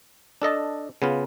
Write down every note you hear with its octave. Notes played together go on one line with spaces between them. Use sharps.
D4 A4 D#5 A5
C#3 B3 F4